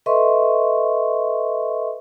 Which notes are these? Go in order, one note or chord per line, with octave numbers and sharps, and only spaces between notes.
A4 B4 D#5 E5 C6 C#6